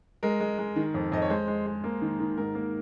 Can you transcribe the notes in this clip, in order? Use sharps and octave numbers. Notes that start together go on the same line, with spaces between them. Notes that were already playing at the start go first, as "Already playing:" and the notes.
G#3 A#4
G#3
G#3
D#3
F2
F2 D#5
C#5
G#3 C5
G#3
G#3
A#3
D#3
D#3
G#2 A#4
A#3